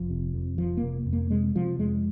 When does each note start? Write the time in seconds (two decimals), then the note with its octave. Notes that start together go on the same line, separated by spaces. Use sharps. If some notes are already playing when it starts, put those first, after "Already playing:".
Already playing: F1 F3
0.10 C3
0.34 F2
0.58 F1 F3
0.77 A#3
0.83 C3
1.06 F2
1.13 A#3
1.30 C3 G#3
1.55 C3 F3
1.79 F2 G#3